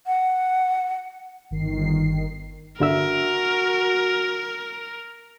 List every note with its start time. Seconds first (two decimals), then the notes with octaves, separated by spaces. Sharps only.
0.06 F#5
1.51 G1 D#3 C7
2.80 G1 D3 F#4 A#4 E5